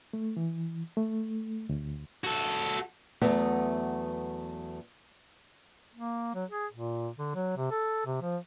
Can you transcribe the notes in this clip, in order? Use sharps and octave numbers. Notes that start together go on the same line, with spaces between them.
A3
E3
A3
D2
F#4 A4
E2 F#3 A3 B3 E5
A#3
F#3
G#4
A#2
D3
F#3
C3
A4
C3
F3